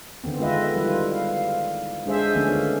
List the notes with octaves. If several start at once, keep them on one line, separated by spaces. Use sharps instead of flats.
D3 D#3 B3 C4
G#3 F4 B4 D#5 E5
D#3 F3 G3 E4 F4 B4
F5
G#3 D4 G#4 C5 E5
D3 D#3 F3 A3 B3 C#4